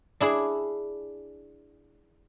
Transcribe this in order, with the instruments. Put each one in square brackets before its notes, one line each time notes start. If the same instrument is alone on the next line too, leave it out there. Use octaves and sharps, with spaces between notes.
[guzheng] D4 E4 G#4